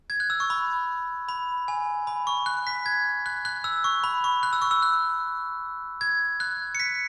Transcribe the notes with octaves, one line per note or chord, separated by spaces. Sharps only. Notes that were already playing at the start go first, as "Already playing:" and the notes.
G#6
F#6
E6
C#6
B5
B5
G#5
B5
C#6
F#6
B6
G#6
F#6
F#6
E6
C#6
B5
C#6
F#6
E6
C#6
E6
F#6
G#6
F#6
C#7
B6